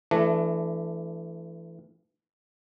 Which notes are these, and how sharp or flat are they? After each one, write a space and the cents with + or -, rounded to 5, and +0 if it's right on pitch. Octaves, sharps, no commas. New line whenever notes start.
E3 +25 A3 -5 D4 +0